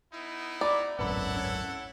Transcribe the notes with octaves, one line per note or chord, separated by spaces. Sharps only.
B3 D#4 E4
D5 A#5 B5 D6
D1 G#1 F#2 B3 E4 A4 F#5 B5
C#4